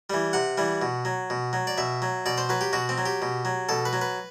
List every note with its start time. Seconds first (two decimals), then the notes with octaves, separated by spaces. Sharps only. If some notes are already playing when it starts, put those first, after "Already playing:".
0.10 E3 G3
0.33 C3 F#5
0.58 E3 G3
0.82 B2
1.05 F#3
1.30 B2
1.53 F#3
1.67 D5
1.78 B2 E5
2.02 F#3
2.26 B2 D5
2.38 C5
2.49 F#3 B4
2.61 G4
2.73 B2 F#4
2.89 C4
2.98 F#3
3.06 G4
3.22 B2
3.45 F#3
3.69 B2 A4
3.85 B4
3.93 F#3
4.01 B4